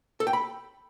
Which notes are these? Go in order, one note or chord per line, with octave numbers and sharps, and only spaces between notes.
A4
G5
B5